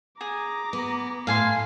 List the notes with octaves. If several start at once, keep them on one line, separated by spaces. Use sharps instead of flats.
G#4 A#5 D6
B3
A2 F5 G#5 C6 C7